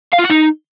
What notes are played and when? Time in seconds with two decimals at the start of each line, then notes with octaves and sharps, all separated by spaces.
0.13 F5
0.19 F4
0.25 F#5
0.30 D#4